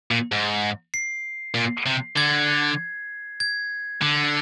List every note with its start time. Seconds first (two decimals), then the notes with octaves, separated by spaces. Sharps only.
0.11 A#2
0.32 G#2
0.94 C7
1.54 A#2
1.86 C3
2.16 D3 G#6
3.40 G#6
4.02 D3